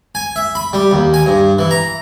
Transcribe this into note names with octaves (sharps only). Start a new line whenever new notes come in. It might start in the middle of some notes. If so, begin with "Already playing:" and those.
G#5
E5
B5
G3
D#2
G#5
G2
E3
A#5